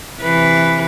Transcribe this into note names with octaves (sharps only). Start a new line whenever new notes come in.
C3 E3 B4